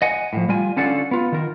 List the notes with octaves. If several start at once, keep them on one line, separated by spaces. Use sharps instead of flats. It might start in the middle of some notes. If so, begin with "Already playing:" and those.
D#5 F#5 G#5
A2 F3
G3 F4 G#5
D3 C#4 F4 A4 D5 F#5
B3 F4
D#3 A#4